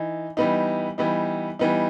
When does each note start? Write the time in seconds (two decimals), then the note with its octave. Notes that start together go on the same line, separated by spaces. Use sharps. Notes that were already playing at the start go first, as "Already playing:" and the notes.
Already playing: E3 D#4
0.37 E3 G3 B3 D#4
0.98 E3 G3 B3 D#4
1.59 E3 G3 B3 D#4